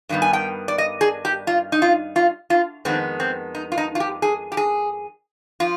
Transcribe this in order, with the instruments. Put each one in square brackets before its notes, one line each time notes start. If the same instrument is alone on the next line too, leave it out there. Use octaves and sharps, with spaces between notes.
[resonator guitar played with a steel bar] G2 D#3 G3 B3
G#5
G5
D5
D#5
G#4
G4
F4
D#4
F4
F4
F4
F2 D#3 G#3 B3 C4
C4
D#4
F4
D#4
F4
G4
G#4
G4
G#4
F3 F4